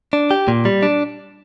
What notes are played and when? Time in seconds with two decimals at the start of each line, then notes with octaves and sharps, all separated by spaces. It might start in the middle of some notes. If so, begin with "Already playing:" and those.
0.13 D4
0.31 G4
0.48 A#2
0.65 G3
0.83 D4